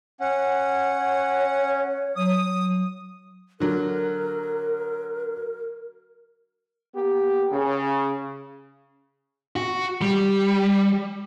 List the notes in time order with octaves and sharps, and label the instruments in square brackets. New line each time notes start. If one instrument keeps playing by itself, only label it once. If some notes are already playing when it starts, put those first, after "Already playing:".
[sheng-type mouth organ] C#4 [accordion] F#5
[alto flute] C#5
[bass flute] F#3 [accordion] D#6
[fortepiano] D3 F#3 [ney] A#4
[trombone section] A#3 B3 G4
C#3
[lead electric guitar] F#4
G3